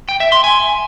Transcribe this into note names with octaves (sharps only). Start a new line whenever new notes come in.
G5
E5
C6
G#5